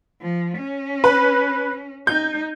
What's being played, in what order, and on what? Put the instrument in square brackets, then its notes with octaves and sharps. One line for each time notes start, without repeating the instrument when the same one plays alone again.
[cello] F3
C#4
[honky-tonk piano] B4
[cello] D#4 [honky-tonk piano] G6